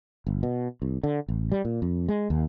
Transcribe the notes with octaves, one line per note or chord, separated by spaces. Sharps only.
G1
B2
C2
D3
A1
G3
A#2
F2
G#3
D#2